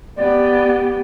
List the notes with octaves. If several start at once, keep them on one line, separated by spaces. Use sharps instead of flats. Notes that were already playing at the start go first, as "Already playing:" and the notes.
B3 G4 D5